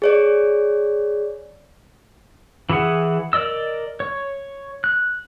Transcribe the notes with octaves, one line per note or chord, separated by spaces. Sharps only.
G#4 C#5 D5
E3 E4 G#4 F#5
A#4 D5 D#5 E6
C#5
F#6